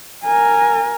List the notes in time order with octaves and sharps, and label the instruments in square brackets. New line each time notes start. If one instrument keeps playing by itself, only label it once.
[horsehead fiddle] A#4 G#5